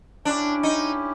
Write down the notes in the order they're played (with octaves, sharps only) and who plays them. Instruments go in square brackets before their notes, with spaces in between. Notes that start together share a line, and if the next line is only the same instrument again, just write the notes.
[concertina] C#4 E4 G4 [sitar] D4
[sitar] D#4